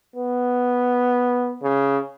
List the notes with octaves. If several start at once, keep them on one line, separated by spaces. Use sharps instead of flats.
B3
C#3